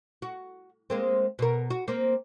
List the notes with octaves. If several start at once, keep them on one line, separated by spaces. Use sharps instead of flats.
F#4
G#3 A#3 C4
B2 A#4
F#4
A#3 C4